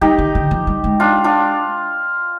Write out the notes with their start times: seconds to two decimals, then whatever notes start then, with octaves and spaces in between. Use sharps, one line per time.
0.01 G3 D#4 G4
0.18 D#3
0.35 D3
0.51 F3
0.67 G3
0.84 G#3
1.00 D4 F4
1.24 D4 F4